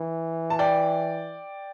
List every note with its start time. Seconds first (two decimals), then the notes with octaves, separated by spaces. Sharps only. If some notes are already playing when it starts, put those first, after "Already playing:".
Already playing: E3
0.50 A5
0.59 D5 G5